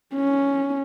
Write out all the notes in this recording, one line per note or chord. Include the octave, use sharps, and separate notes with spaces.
C#4